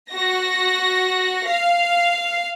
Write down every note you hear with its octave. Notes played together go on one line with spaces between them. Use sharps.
F#4 A#6
F5